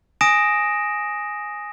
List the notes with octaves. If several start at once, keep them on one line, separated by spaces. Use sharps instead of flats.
G#5 D#6 A#6 D7 E7